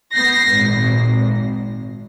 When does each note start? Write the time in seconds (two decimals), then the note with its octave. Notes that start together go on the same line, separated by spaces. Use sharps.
0.15 B3 G6 A#6 C7
0.51 G#1 A#2